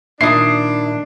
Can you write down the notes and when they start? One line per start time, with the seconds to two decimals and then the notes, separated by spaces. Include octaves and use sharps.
0.21 A#2 D#3 D4 E4 D#6 C7